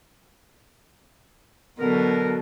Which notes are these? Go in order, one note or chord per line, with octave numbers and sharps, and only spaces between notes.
B2 D3 F#3 A#4